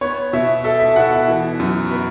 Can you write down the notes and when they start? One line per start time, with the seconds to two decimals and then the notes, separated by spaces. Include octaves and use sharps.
0.01 B3 C#5
0.33 B2 E5
0.64 A4 E5
0.80 E5
0.96 B2 F#5
1.12 E5
1.28 E3
1.59 F#2
1.91 B3